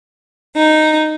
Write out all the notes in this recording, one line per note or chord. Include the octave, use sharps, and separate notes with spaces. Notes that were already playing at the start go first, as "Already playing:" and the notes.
D#4